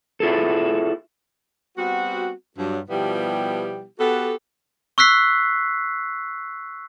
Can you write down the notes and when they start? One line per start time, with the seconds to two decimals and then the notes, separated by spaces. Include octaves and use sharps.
0.20 E4 F4 G#4 A4
1.77 G3 B3 C4 F#4
2.57 G2 F#3
2.90 B2 F3 G3 B3 E4 G4
3.99 B3 F#4 G4 A4
4.98 C#6 E6 F#6 B6 C7